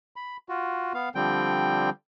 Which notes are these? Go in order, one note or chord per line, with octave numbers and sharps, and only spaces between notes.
B5
F4 F#4
B3 F5
D3 F3 G3 C4 G5